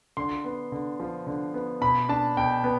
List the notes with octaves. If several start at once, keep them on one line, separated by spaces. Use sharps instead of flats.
D3 C6
B3
D3
F3
D3
B3
B2 B5
D4 A5
B2 G5
B3